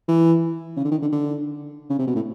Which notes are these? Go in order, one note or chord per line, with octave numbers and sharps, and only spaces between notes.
E3
C#3
D3
D#3
D3
D3
C#3
C3
B2
A2